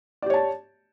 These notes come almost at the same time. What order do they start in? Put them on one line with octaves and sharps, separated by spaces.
D5 G4 C#5 A5